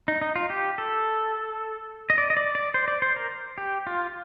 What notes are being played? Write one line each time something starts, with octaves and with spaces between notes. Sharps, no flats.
D#4
D#4
F4
G4
A4
D#5
D5
D#5
D5
D5
C5
D5
C5
A#4
G4
F4